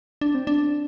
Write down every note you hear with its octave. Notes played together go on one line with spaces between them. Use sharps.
D4
C4
D4